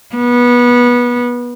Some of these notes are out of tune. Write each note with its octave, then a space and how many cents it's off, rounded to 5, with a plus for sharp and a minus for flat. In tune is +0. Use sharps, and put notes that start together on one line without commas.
B3 -20